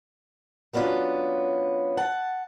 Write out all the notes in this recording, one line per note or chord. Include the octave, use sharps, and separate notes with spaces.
F#3 B3 C#4 D4 F4
F#5 A5